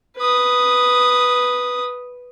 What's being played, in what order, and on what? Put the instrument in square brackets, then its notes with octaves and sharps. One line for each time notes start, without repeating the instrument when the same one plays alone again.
[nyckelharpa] B4 D#6